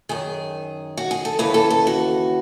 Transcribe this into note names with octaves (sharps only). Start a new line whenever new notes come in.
F#2 D#3 G#4
F#4
G#4
A4
D#2 C#3 E3 B4
A4
A4
F#4